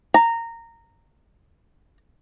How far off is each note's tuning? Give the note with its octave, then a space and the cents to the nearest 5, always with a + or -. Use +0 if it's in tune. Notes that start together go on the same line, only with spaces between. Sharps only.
A#5 -15